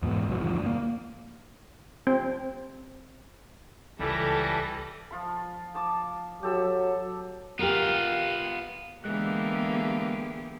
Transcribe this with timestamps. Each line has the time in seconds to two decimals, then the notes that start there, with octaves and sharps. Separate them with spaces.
0.02 E2 G#2 B2 B3
0.27 C2 G#2 F#3
0.39 E1 G2 D#3 F3
0.53 D2
0.66 A#3
2.07 C4
3.99 C#2 E3 G3 A4 A#6
5.11 F3 F4 B5
5.74 F3 A5 D6
6.43 F#3 G4 A4 E6
7.59 B3 F4 G4 A#4
9.04 D3 E3 G#3 A#3 B3 G4 G#4 F#6